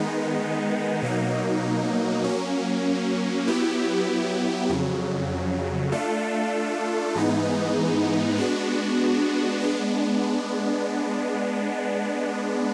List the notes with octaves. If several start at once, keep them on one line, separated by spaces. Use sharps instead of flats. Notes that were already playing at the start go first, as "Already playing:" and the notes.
Already playing: D#3 G#3 B3 D#4
B2 F#3 A#3 D#4
F#3 A#3 C#4
F#3 B3 E4 G4
F2 C#3 F#3
A3 D4 F4 A4
G#2 E3 G#3 B3 D#4
G#3 B3 D4 F#4
G#3 B3 D4